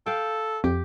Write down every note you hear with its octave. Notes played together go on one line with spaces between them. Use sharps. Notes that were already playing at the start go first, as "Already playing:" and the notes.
A4 F5 G5
F2 G4